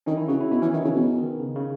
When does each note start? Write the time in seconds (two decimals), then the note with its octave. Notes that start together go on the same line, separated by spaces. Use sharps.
0.06 D#3 C#4
0.17 E4
0.28 C#3 F#4
0.40 E4
0.51 B2 E4
0.62 E3 C#4
0.73 D#3 D#4
0.84 C#3 E3
0.96 B2
1.18 D#3
1.40 C#3
1.55 C#3